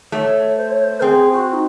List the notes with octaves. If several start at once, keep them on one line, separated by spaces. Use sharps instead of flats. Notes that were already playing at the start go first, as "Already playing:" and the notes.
A3 C#5
C5
C#5
C5
C4 G#4
F#4
D#4